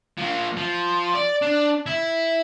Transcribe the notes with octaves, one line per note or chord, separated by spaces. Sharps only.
F3 A#3
F3
D5
D4
E4